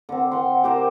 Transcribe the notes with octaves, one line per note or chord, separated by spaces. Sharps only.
D3 C4
F#5 C6
G4 A#4 C5